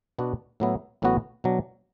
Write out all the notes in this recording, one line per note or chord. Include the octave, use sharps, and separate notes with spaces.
B2 B3 D4 F#4
A2 F#3 B3 E4
A1 A2 F#3 B3 F#4
B2 F#3 D4